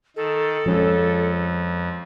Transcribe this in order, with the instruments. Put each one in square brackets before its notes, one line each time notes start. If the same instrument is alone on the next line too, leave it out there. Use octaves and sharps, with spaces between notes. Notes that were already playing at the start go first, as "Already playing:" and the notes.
[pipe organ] D#3 [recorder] A4
[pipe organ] F2 [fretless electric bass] F3 G#3 C#4